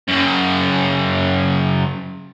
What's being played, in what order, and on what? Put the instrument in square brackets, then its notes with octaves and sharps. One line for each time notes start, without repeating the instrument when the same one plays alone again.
[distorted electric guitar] F#2 C#3